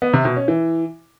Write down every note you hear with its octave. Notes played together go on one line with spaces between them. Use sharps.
B3
C3
B2
C#4
E3